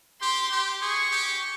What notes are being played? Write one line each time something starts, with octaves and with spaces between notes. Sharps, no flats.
G4 C6
G4
G#4 C#6
G4